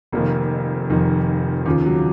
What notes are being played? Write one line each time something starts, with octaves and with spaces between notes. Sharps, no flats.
F1 F2 D#3 A#3
F1 F2 D#3
D#2 C#3 F3
F#3